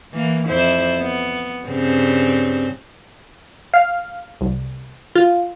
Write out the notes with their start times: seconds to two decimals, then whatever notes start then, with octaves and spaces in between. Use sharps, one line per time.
0.13 E3 A#3
0.48 F2 E4 C5
0.98 B3
1.66 G2 C#3 C4
3.74 F5
4.41 C2
5.16 F4